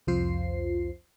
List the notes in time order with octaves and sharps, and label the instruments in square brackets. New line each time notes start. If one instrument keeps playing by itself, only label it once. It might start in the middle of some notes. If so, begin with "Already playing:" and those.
[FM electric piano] C2 F2 F3 F4 C5 C7